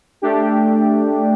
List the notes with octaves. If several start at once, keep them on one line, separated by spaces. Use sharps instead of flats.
A3 D4 G4